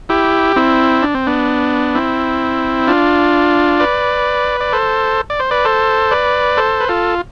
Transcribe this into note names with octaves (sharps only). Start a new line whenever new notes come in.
E4 G4
C4 E4
D4
C4
B3 D4
C4 E4
D4 F4
B4 D5
D5
A4 C5
D5
C5
B4 D5
A4 C5
B4 D5
A4 C5
B4
F4 A4